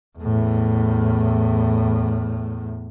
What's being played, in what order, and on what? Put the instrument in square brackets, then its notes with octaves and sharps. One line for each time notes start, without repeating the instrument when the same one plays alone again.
[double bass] E2 A2